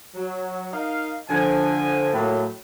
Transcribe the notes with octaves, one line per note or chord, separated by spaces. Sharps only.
F#3
D#4 A#4 D#5 F5
D3 F3 G#5
A2 F#3 A#3